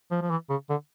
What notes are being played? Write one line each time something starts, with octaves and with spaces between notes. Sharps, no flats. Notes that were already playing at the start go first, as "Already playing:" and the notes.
F3
F3
E3
C#3
D3